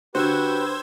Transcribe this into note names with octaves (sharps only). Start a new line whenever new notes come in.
D3 F#4 G4 B4 C5 E6 G#6